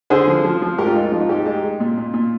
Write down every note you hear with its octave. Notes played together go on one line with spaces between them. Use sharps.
D3 G#4 C5
F3
F3
F3
G#2 G4 A#4
F4
G#3 D#4
F4
F3 D#4
F4
G#2 D#4 G4
G#3 D#4 G4
G#3
A#2
A#2
A#2